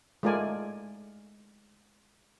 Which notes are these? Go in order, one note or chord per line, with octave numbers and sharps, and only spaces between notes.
G#3 A3 F4 A#4 D5 G#5